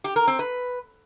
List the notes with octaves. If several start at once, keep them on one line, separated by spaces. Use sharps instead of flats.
G4
A#4
C4
B4